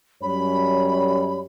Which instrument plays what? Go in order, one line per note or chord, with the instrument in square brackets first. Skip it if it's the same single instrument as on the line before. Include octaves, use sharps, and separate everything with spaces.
[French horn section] F#2 G3 C#5 [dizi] B5